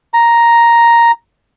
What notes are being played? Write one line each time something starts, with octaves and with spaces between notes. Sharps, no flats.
A#5